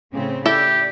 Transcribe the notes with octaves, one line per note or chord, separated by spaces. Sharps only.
A2 C#3 C4
E4 G4 A4 D5 E5